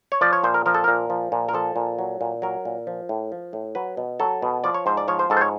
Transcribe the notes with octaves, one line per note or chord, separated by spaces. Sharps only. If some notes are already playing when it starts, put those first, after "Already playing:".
C#5
F3 D5
C#5
A#2 C5
A#4
F3 A#4
A4
A#2 A#4
F3
A#2
A#4
F3 A4
A#2
F#3
A#2
F#3 A#4
A#2
F3
A2
F3
A2
F#3 B4
B2
F#3 A4
B2
F3 D5
C#5
G#2 C5
D5
F3 C#5
C5
G#2 A4
C5
C#5